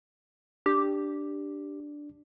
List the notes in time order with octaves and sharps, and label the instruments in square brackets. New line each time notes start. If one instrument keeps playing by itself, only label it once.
[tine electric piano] D4 [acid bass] G4